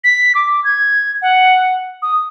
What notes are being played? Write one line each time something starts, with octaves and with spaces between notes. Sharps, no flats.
B6
D6
G#6
F#5
D#6